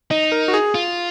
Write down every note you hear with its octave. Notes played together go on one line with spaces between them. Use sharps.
D#4 D#5
A#4
F#4
G#4
F4